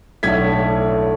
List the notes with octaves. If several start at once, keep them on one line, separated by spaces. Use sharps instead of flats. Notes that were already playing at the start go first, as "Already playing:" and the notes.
B1 A2 D3 A3 G#6 B6